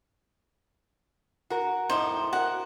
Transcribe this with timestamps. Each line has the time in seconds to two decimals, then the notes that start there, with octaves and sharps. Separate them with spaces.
1.50 F#4 A#4
1.90 F2 A2 D#4 C5
2.33 F#4 A#4 F#5